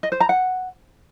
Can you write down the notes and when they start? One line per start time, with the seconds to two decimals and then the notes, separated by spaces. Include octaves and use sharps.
0.03 D#5
0.12 C5
0.20 A#5
0.29 F#5